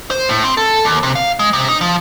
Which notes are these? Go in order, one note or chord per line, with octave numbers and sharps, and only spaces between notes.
C5
A2
C4
A4
D#2
C3
F5
G#3
C3
D#4
F3